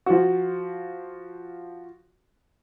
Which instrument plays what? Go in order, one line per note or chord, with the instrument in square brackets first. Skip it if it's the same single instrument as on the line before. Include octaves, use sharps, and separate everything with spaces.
[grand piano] F3 F#4